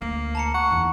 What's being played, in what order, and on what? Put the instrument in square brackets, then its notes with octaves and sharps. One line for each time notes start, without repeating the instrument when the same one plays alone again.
[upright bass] D2 [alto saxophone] A#3
[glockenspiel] A5 A#5 C#7
[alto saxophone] F#5 [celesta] C#6
[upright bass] E2 D#3